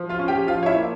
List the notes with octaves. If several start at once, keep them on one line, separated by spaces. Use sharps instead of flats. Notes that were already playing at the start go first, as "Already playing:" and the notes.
Already playing: F3
F4 F5
C#4
G4 G5
F3 F4 F5
C#5
E4 E5
A#3